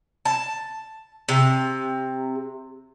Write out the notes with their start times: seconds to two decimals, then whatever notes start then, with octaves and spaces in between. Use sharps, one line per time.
0.25 A5
1.28 C3